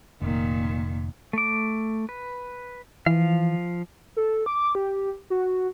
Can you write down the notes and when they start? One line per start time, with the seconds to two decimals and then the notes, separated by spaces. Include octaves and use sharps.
0.22 F1 A#2 D#3
1.33 A3 D6
2.09 B4
3.06 E3 F3 F5
4.17 A4
4.46 D6
4.75 G4
5.30 F#4